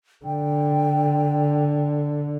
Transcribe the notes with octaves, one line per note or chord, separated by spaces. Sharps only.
D3 G5